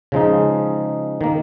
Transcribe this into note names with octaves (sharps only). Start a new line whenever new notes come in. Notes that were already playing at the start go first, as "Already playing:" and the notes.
C#3 F3 G#3 D#4
D#3 A#3